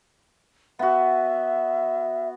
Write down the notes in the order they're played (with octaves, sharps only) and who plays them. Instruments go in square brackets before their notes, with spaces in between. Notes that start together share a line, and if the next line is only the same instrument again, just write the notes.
[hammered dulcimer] B3 F#4 [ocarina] E5